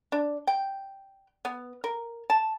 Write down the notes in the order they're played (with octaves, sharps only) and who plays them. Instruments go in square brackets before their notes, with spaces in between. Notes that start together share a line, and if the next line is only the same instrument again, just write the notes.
[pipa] D4
G5
B3
A#4
A5